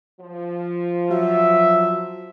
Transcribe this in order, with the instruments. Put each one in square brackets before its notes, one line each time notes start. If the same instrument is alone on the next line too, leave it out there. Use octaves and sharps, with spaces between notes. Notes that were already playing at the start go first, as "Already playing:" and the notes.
[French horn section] F3
[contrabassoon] F#3 [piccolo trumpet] E5